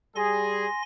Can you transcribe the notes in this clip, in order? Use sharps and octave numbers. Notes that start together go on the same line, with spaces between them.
G3 G#4 G#5 C6 A#6